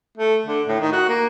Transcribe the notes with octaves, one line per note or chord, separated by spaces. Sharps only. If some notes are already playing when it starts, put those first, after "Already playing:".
A3
D3
A2
D#3
F#4
A#3